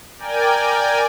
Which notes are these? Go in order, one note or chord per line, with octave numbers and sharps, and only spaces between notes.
A#4 D5 G5 G#5